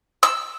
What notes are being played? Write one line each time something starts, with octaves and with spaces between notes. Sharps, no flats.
E6